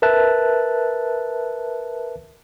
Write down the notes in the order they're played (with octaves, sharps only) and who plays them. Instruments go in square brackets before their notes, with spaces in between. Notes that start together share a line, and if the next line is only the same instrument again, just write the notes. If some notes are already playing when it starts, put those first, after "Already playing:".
[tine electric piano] A#4 B4 E5 A5 F#6